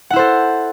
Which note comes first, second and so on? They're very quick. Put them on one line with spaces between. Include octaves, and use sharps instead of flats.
F#5 E4 C5 A4